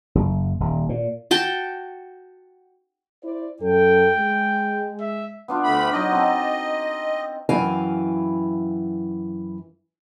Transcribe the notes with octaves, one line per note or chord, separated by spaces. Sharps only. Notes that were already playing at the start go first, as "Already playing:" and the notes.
F#1
D#1
A#2
F#4 G5 A5
E4 C5 D5
F#2 A4 G5
G#3
E5
B3 D4 F4
D2 A3 B5
F#3 D#4 D5 D#5
C4 D#4 A4
F#2 E3 E4 F5 G5 G#5